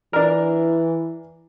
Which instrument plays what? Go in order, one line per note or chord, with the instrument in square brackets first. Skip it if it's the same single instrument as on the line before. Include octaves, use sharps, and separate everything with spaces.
[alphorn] E3 [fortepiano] D4 A#4